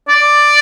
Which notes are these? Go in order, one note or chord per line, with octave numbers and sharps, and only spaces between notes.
D5